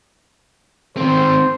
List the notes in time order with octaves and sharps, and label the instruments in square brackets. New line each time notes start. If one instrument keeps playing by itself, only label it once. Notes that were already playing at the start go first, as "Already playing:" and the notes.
[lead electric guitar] D#3 C4 [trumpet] C5